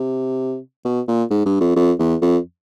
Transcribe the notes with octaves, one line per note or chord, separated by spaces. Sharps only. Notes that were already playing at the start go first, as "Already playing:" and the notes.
Already playing: C3
B2
A#2
G#2
G2
F2
F2
E2
F2